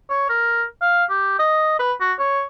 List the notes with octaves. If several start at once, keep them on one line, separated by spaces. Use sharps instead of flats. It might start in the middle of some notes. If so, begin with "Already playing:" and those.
C#5
A#4
F5
G4
D#5
B4
F#4
C#5